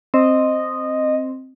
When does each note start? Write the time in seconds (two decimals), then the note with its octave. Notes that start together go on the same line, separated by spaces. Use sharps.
0.14 C4 D#5